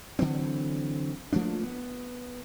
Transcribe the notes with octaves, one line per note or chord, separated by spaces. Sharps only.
D3 E3 F#3 C4
F3 A3 A#3 D4
B3